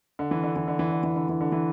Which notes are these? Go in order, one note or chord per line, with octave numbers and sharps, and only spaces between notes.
D3
E3
D3
E3
D3
E3
D3
E3
D3
E3
D3
E3